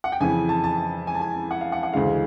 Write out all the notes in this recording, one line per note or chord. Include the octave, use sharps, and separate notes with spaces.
F#5
G5
F2 C#3 E3 G#5
A5
A5
G#5
A5
G#5
F#5
F5
F#5
F#5
D2 C#3 E3 G#3 F5